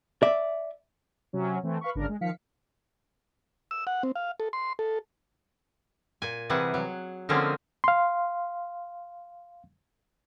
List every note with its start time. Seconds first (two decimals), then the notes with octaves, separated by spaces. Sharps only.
0.23 D5 E5
1.33 C3 F#3 C#4
1.63 E3 A3 C4
1.81 B4 F5 B5 C#6
1.95 G1 C#3 D4 A#4
2.09 G#3
2.21 D#3 F3 F5 B6 C#7
3.71 E6
3.87 F#5
4.03 C4
4.16 F5
4.40 A4
4.53 C6
4.79 A4
6.22 A#2 G#5
6.49 C3 E3 G3 G#4 F#5
6.74 F#3
7.29 D3 F3 G#3 A#3 C4 C#4
7.84 F5 C6